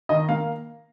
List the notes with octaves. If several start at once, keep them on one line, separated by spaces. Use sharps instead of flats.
D#3 D#5
A#3 F5